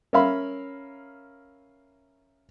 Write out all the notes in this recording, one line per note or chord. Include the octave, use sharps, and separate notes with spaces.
C#4 A#4 E5 F5 B5